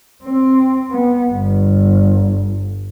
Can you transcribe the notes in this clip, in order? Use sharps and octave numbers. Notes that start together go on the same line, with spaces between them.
C4
B3
G1